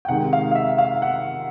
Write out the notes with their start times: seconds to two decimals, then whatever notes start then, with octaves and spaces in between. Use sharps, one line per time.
0.05 G5
0.08 C3 D#3 G#3 F#5
0.33 F5
0.51 F5
0.55 E5
0.78 F5
1.02 F#5